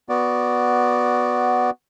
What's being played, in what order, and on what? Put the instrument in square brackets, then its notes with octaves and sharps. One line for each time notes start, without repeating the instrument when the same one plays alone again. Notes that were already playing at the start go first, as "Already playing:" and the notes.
[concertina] B3 F#4 D5